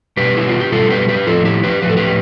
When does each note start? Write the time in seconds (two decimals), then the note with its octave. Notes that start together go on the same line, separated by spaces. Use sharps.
0.17 B2 G3 G4 B4
0.37 E4
0.48 F4
0.60 G4
0.72 B2 G3 F4 A4
0.90 G4 B4
1.09 G4 B4
1.26 A2 F3 F4 A4
1.45 E4 G4
1.63 G4 B4
1.82 F3 B4
1.86 A2 A4
1.97 G4 B4